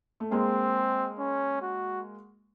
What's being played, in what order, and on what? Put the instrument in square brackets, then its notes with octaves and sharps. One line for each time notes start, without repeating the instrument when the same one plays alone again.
[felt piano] A3
[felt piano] G#3 A#3 [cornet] C4
[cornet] C#4
F#4